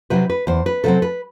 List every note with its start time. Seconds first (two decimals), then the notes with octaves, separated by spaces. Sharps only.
0.10 C3 F#3 C4 B4
0.30 B4
0.47 E2 C5
0.66 B4
0.84 C3 F#3 C4 A4
1.02 B4